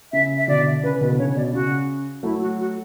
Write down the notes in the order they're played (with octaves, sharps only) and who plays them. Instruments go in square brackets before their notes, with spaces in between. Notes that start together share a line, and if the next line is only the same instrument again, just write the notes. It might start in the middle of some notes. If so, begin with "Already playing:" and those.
[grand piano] C#3 [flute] E5
[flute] E5
[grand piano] B2 D3 [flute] D5
[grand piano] C#3 [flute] B4
[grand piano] B2 D3 [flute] B4
[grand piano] D3
[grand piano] C#3 [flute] C#5
[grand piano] B2 [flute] D5
[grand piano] C#3 [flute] F#4
[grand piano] F#3 A3 [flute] E4
[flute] F#4
F#4